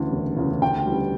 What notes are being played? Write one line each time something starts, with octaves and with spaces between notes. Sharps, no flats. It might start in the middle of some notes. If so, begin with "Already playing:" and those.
Already playing: D2 C#3 E3
E1
D2 C#3 E3
D2 G5
C#3 E3 G3